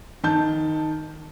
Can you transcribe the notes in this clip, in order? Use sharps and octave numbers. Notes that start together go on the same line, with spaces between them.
D#3 A5 G6